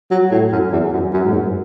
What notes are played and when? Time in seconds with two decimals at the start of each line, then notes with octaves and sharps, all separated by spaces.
0.11 F#3
0.31 A2
0.52 F#2
0.72 E2
0.93 F#2
1.13 F#2
1.24 G#2
1.34 F#2